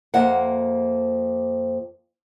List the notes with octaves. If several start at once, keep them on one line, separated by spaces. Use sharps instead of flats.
F2 F3 A#3 E5 F#5